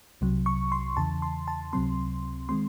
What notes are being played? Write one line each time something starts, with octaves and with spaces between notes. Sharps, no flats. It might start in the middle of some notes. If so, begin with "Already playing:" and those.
C2 C3 F#3
C#6
C6
E2 C#3 E3 A5
C6
A5
C#2 C3 F#3 C4 C6
D#3 G#3 C4 C6